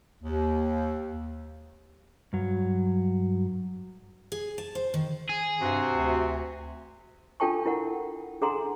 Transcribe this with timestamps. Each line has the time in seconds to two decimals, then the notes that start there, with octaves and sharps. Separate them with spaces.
0.23 D#2
2.33 G2 F#3
4.32 G#4
4.58 A5
4.75 C5
4.94 D#3
5.29 G#4
5.61 G2 C3 F#4
5.92 D2
7.40 D4 F4 A4 G5 A5 C#6
7.66 E4 A#4 F#5
8.41 D4 G#4 A4 F#5 A#5 C6